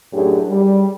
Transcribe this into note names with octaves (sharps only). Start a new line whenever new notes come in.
F#2 A2 D4 G4 G#4
G3